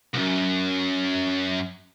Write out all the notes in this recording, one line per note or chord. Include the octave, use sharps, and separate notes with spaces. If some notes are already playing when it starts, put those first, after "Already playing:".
C2 F#2